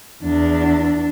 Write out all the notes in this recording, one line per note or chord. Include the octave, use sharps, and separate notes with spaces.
E2 D4